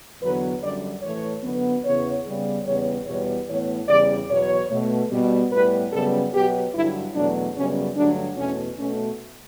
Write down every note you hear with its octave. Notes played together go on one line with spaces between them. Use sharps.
E2 D3 F#3 B3 B4
F#2 D3 G3 D5
A2 E3 A3 C#5
F#2 D3 F#3 B3
E2 C#3 E3 B3 C#5
C#3 G3 B3
E2 C#3 G3 B3 C#5
E2 B2 G3 B3 C#5
A2 E3 B3 C#5
E2 C#3 G3 D5
E2 B2 F#3 B3 C#5
B2 A3
B2 G3 B3
A2 G3 B3 B4
F#2 C#3 G3 B3 A4
B2 F#3 B3 G4
G2 D3 F#3 E4
E2 B2 F#3 A3 D4
F#2 C#3 G3 B3 C#4
G2 D3 F#3 A3 D4
E2 B2 A3 C#4
B2 A3 C#4